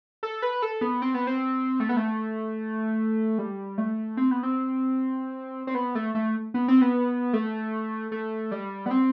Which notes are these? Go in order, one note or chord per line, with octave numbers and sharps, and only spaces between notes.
A4
B4
A4
B3
C4
B3
C4
A3
B3
A3
G3
A3
C4
B3
C4
C4
B3
A3
A3
B3
C4
B3
A3
A3
G3
B3
C4